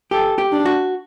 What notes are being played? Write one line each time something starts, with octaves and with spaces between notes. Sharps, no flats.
G4 A4
G4
D4
F#4